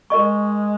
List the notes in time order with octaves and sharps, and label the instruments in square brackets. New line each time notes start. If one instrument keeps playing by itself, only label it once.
[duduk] G#3 [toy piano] A#4 D#5 C#6